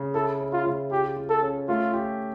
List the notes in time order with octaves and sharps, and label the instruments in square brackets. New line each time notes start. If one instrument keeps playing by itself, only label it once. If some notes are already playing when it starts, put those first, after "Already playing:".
Already playing: [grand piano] C#3
[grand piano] E4 [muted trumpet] A4
[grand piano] C#4
[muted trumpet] F4
[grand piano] C#3
[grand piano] F4 [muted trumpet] G4
[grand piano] F4
[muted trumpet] A4
[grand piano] C#4
[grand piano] A3 [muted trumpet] F4
[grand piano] G4